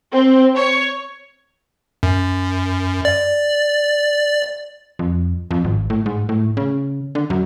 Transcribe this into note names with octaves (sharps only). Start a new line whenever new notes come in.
C4
C#5
F#2
D5
F2
F2
G#1
A2
G#2
A2
C#3
D3
F#2